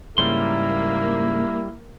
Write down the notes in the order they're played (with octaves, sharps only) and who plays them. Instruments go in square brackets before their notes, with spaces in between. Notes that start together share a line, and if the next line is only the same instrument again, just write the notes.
[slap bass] G#2 C#3 [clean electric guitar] G3 C6 [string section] A#3 [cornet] E4